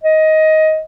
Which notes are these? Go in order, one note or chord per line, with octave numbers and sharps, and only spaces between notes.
D#5